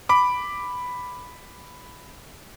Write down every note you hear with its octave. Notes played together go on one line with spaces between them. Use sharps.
B5 D6